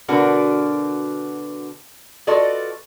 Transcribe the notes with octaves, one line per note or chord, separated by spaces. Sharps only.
B2 D3 D4 F#4 A#4 B4
F4 F#4 A4 B4 D5 D#5